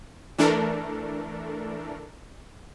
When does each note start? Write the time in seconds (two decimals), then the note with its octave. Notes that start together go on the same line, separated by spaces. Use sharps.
0.39 E3 A3 D4 A4 A#4